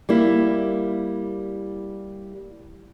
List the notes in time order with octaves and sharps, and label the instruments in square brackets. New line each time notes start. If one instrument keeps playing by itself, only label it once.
[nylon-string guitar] G3 A#3 E4